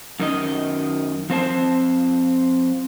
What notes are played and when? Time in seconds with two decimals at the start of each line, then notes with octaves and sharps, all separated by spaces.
0.20 F#2 D#3 D#5
1.30 F3 C4 C5 A5